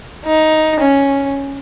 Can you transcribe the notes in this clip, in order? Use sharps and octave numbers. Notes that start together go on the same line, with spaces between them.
D#4
C#4